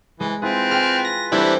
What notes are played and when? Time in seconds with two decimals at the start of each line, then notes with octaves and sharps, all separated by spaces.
0.20 E3 G#3
0.42 C4 E4 F4 G#4 B4
0.71 G#4 G5 F6
1.05 A#6
1.32 E3 G3 A3 C4 D4 E4 G4